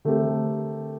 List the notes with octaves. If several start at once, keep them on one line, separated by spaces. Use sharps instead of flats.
D3 A3 C4 G4 A#4